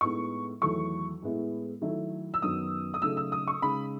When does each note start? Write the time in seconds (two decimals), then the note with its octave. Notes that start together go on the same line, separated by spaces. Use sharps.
0.01 A2 G#3 B3 D#4 C#6
0.61 E2 D#3 F#3 A3 C#6
1.22 A2 G#3 B3 E4
1.81 D#3 F#3 A3 E4
2.34 E6
2.42 F#2 D#3 F#3 B3 D#4 D#6
2.94 D#6
3.02 C#3 F#3 A3 D#4 E6
3.17 E6
3.32 D#6
3.47 C#6
3.62 C#3 G#3 D#4 B5